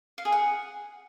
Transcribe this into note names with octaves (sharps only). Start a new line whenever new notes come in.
F5
G#4
F#5